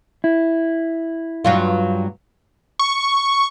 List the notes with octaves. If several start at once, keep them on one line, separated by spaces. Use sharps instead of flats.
E4
G2 F#3 F4
C#6